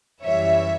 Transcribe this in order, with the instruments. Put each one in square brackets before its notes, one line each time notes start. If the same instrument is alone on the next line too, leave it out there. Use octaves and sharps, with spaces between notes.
[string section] F#2 E3 G3 C#5 E5